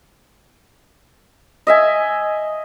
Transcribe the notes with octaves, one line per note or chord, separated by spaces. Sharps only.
D#5 E5 G#5